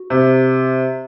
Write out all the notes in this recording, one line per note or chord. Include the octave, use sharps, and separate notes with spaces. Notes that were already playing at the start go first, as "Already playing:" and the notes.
Already playing: F#4
C3